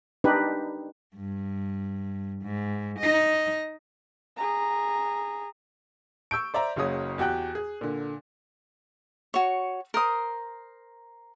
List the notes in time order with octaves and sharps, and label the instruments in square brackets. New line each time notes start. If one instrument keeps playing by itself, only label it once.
[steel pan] D4 D#4 G4 B4
[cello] G2
G#2
D#4 D#5
[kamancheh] G#4 A#5
[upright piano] C#6 E6 G6 D7
C5 D5 E5 A#5
F#1 C#3 F#3 C#5 D#6
E2 F#4 G4 G5 F#6
G#4
A#2 D3
[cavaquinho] F#4 C#5
A#4 C5 D#6